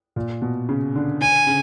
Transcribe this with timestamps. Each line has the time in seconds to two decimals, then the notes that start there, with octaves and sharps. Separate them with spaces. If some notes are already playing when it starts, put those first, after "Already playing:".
0.16 A#2
0.42 B2
0.69 C#3
0.95 D3
1.21 D3 G#5
1.47 C#3